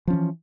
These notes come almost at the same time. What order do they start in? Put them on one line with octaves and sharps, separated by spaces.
F3 C#4 E3